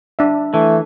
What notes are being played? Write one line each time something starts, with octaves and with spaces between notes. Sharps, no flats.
D4 E5
E3 A3